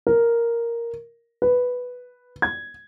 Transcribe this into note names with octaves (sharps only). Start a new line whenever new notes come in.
A#4
B4
G#6